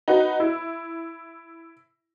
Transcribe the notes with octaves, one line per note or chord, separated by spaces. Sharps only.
D#4 F#4 B4
E4